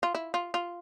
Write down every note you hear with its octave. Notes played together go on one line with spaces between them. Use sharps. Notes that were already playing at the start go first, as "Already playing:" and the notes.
F4
E4
F4
F4